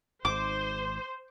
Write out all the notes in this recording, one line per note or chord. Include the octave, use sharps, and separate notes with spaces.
G#1 G#2 C5 D6